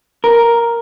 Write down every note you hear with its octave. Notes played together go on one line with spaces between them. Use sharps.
A#4